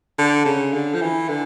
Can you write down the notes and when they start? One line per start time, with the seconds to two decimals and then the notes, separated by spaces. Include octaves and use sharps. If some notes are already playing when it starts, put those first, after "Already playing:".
0.18 D3
0.45 C#3
0.73 D3
0.94 F3
1.01 E3
1.29 D3